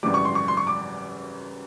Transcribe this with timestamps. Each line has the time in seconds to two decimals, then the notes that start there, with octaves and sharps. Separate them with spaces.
0.03 G#1 F#2 C#3 E3 G3 D6
0.14 C#6
0.25 C6
0.35 C#6
0.48 C6
0.57 C#6
0.67 D6